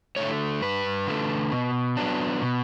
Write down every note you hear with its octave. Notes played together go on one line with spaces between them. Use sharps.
D3 A3 C#5
G2 B4
D3 A3
B2
F#3 B3 D4
B2